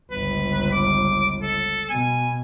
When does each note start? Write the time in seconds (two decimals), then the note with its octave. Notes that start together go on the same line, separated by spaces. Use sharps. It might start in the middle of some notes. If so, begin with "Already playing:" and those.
0.11 G1 C#2 B4
0.72 D6
1.42 A4
1.90 B2 G#5